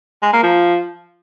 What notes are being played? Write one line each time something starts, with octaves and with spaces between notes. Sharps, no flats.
G#3
A#3
F3